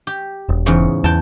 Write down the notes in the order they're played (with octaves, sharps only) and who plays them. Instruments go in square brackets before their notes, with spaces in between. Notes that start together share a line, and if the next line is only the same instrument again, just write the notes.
[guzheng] G4
[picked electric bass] E1
[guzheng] E2 G#2 C#3
[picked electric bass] E2 [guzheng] G5 A5